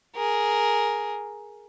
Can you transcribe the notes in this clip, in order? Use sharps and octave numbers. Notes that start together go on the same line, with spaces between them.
G#4 A#4